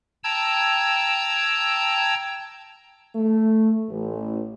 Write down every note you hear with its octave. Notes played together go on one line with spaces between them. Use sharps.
G5 A5 A#5 E6 G#6
A3
A1